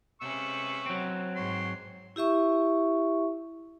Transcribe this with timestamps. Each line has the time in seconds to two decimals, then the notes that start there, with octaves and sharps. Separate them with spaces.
0.21 C3 C#4 B4 C#6 E6
0.86 F#3 C4
1.37 G#2 C#5 C6
2.16 E4 G4 E5 C#6